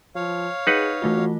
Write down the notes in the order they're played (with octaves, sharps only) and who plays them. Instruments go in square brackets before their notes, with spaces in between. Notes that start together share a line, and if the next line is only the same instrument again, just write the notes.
[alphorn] F3 [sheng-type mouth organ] C#5 F5
[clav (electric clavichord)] D#4 B4 F#5 [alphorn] G#4
[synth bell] E3 A3 F4 [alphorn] F#4